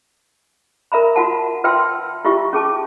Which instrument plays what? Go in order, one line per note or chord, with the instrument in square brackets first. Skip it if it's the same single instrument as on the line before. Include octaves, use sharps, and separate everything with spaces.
[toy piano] A#4 E5 A#5 B5
F4 F#4 F#5 A5
F4 B4 E5 G5 C6 E6
E4 F4 G4 E5 C#6
C#4 G#4 A5 D6